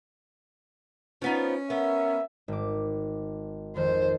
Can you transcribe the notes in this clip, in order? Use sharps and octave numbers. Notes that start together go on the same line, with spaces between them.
F3 B3 C#4 D#4
B3 A#4 E5
G#1 D6
F2 D#3 C5